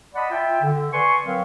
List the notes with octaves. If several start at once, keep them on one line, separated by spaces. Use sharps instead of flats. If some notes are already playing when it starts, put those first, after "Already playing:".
D5 D#5 F#5 A5 B5
F4 E5 G5
D3
B4 D5 G#5 C6 C#6
F#3 C4 A#4 B4 F5